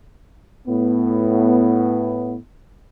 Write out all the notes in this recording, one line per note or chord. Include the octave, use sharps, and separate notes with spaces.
A2 B3